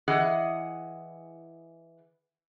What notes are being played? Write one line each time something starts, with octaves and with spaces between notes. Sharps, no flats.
E3 G#4 D#5 F#5